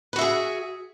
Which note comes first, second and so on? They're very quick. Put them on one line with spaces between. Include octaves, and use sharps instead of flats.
B4 F#4 E5 G#4